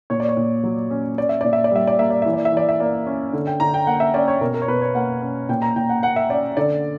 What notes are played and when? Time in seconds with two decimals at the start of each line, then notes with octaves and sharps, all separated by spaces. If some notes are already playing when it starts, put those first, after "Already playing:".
0.10 A#2 C#5
0.20 D5
0.29 C#5
0.37 A#2
0.64 F#3
0.90 C#4
1.18 C#4 D5
1.29 E5
1.41 A#2 D5
1.53 E5
1.64 D5
1.72 G3 E5
1.87 D5
1.99 A#3 E5
2.10 D5
2.22 E3 E5
2.33 D5
2.45 E5
2.52 E3 D5
2.69 E5
2.80 A#3 D5
3.06 C#4
3.33 D3
3.47 G5
3.60 D3 A#5
3.74 G5
3.87 A#3 F#5
4.00 E5
4.14 C#4 D5
4.28 C#5
4.41 B2 A#4
4.54 A#4
4.62 C#5
4.68 B2 B4
4.82 C#5
4.95 A#3 F#5
5.22 C#4
5.49 A#2 G5
5.62 A#5
5.76 A#2 G5
5.89 F#5
6.03 A#3 F#5
6.16 E5
6.29 C#4 D5
6.57 D3 D5